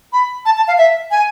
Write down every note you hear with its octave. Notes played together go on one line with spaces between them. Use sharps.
B5
A5
A5
F5
E5
G#5